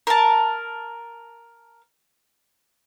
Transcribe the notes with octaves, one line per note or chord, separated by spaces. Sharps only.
A#4 A5